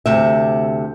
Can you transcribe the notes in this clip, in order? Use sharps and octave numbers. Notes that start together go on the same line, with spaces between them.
D2 C3 E5